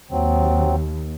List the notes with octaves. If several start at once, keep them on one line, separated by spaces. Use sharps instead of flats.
D#2 F#3 C4